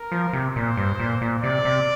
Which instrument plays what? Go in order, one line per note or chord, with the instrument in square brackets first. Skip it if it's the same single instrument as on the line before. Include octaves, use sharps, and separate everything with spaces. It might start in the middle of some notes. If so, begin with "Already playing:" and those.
Already playing: [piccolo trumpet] A#4
[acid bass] F3
C3
[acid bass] A#2 [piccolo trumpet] C5
[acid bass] G2
A#2
A#2
[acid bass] C3 [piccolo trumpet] D5
[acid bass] C3